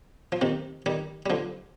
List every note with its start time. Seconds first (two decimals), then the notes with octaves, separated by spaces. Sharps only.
0.32 F3
0.41 C3 D#3
0.86 D#3 G3
1.26 G3
1.30 D3 F3